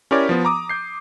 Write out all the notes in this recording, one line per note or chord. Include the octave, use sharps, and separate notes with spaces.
C#4 E4 G4 A#4 C#5 D5
F3 B3
A#5 D6 D#6
G6 C7